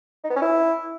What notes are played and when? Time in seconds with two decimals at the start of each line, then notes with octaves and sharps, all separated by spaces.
0.24 D#4
0.30 B3
0.36 C#4
0.42 E4